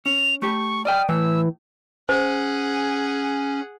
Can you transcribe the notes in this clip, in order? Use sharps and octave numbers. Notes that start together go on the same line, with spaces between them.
C#4 F7
A3 G4 C#6
D5 D#5 G5 F6
A2 E3 E6
C#4 G#4 C5 F#5